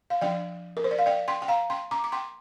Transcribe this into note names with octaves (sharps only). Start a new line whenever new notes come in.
F5
F3 D4 D5 G5
A#4
C5
D5
F5
D5 G5
G5 C6
G5
F5 A#5
G5 C6
A#5 D6
D6
G5 C6